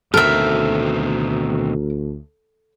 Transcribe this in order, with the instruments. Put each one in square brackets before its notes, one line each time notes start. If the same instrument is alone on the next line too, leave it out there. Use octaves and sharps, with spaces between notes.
[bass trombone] D2 [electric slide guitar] B2 D#3 C4 [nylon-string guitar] A4 [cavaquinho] A#4 E5